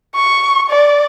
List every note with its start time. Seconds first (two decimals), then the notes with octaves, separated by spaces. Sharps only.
0.15 C#6
0.70 D5